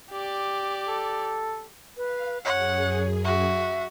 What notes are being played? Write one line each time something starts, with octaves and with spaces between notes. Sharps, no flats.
G4 D5
A4
B4 F5
F#2 G#4 C#5 F#5
F#4 E5